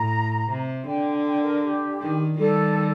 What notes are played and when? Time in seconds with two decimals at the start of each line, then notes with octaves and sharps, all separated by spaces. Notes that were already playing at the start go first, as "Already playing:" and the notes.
Already playing: A2 A#5
0.49 C3
0.87 D3 G5
1.25 G5
1.43 A#4
1.63 G4
2.01 D#3
2.39 D#3 G3 A4